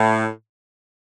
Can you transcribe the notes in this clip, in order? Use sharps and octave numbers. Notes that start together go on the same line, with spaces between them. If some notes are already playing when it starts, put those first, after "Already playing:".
Already playing: A2